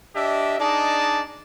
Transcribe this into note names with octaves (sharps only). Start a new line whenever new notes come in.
D4 G4 D#5 E5
D4 D#4 G#4 D5 D#5 A5